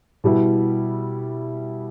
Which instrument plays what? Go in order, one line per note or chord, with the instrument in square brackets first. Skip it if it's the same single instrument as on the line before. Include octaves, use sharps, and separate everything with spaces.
[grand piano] B2 G3 E4